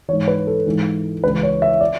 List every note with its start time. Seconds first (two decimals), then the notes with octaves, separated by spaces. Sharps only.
0.08 E3 C#5
0.13 G#2
0.28 B4
0.47 A4
0.66 G#2 E3
1.24 C#2 C#3 E3 B4
1.43 C#5
1.62 E5
1.81 D5